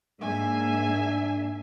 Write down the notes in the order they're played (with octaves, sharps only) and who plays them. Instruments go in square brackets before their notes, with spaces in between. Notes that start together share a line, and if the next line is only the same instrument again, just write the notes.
[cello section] G#2 A#3 E5 [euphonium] D4 [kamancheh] G#5